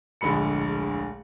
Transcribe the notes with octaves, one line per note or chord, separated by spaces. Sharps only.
D1 A#1 D3 G#3 B5 C#7